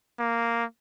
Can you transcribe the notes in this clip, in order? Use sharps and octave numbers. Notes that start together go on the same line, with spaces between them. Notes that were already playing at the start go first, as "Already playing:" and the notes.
A#3